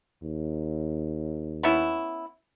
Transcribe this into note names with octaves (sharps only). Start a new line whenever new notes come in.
D#2
B3 C#4 E4